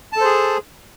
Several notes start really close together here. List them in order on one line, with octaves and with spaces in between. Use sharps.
A5 A4 C5 G#4